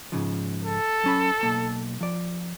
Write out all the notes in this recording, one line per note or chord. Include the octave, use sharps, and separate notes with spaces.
G#2 C#3 F3
A4
F#3 C#4 B5
B1 A#3 A5
F3 D5